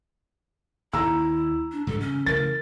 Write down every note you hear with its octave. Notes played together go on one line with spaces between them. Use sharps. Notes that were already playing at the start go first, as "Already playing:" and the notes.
D#2 E4 A#5 E6
D4
G#2 E3 G3 A4
C#3 C#4
C#3 E3 A3 A#4 A6